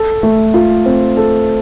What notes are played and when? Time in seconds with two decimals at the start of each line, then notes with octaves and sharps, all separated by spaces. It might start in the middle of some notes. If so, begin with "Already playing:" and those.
Already playing: A4
0.23 A3
0.54 F4
0.86 C4
1.17 A4